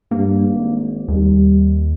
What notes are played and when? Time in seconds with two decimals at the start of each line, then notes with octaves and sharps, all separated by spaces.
0.11 G2 A#3
0.48 G#1
1.08 D#2 G3